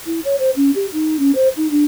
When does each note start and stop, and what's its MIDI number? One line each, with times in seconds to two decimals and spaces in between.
0.06 0.19 64
0.24 0.35 73
0.39 0.50 72
0.56 0.70 61
0.74 0.86 67
0.92 1.18 63
1.19 1.31 61
1.35 1.48 72
1.56 1.69 63
1.70 1.84 62